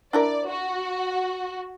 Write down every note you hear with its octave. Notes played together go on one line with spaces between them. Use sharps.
D4 E4 A#4 D5
F#4